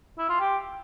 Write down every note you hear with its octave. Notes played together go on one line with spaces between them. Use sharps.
E4
F4
G4